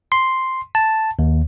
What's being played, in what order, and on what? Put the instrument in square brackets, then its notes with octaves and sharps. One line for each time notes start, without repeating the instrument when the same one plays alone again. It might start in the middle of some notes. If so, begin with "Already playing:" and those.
[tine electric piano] C6
A5
D#2